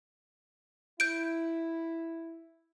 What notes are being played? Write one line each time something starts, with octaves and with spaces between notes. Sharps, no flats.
E4 G6 D7